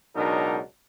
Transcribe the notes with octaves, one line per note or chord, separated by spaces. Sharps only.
C#2 B2 F#3 D4 D#4 A#4